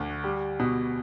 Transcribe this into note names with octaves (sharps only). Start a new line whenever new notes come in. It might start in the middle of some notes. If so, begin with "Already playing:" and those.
Already playing: D2 D3
G3
B2